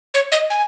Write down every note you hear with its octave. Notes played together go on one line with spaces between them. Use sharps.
C#5
D#5
G#5